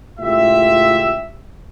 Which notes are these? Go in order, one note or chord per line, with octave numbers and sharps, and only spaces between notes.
C#2 A2 F4 G4 E5